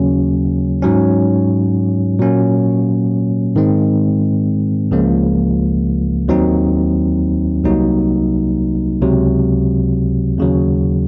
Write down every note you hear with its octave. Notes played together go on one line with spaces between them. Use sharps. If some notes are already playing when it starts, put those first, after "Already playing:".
Already playing: D#2 C#3 F#3 A#3 C#4
G#2 F#3 C#4
A#2 F#3 A#3 C#4
G#2 D#3 G#3 C4
C#2 C#3 F3 A#3
D#2 D#3 F#3 C4 D#4
C2 C3 F#3 A#3 D#4
C#2 C3 F#3
D#2 C#3 F#3